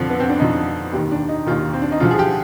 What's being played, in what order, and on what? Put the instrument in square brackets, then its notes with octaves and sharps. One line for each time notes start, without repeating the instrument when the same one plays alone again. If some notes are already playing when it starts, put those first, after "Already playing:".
Already playing: [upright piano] F2 D3 F3 D4
B3
C4
D4
F2 D3 F3 D#4
D#2 D#3 G4
D4
D#4
D#2 D#3 F4
C4
D4
D#4
D2 D3 F3 F4
G#4
G4